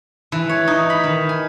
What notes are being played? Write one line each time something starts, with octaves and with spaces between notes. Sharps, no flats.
E3
C#5
D#4
B5
D#3
G#5